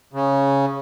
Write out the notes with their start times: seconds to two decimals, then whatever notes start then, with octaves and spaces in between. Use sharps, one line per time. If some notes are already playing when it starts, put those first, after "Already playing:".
0.13 C#3